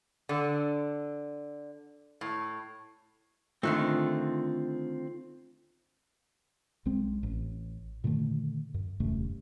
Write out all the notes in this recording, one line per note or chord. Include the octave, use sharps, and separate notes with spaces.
D3
A2
D3 D#3 A3 C4 F4 F#6
B1 G#3 C4
A1
A#2 D3 D#3 A3
F#2
D#1 F#2 C3 A3